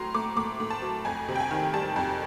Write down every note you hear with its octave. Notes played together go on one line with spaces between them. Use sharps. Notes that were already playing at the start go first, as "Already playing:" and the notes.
Already playing: A2 F#3 A#5 C6
A3 D6
A2 D6
A2
A5
F#3
F2 G#5
C3
G5
G#5
D#3
G3 A5
F2